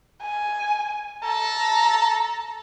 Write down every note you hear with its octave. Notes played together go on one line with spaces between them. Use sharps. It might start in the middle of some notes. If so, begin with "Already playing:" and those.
G#5
A4 A5 A#5